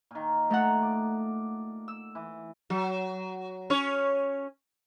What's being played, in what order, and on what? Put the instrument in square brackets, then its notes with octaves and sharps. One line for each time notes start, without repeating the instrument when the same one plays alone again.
[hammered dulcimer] A#2 D#3
[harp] A3 A4 F#5 [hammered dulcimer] D#5 A#5
[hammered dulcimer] D5
[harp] E6
[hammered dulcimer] E3
[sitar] F#3
C#4 C#5